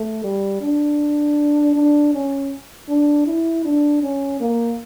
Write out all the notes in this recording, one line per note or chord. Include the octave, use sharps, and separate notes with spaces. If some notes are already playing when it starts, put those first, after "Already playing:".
Already playing: A3
G3
D4
D4
C#4
D4
E4
D4
C#4
A#3